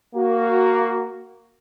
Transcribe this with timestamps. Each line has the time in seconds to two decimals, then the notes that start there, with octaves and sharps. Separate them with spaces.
0.16 A#3 F#4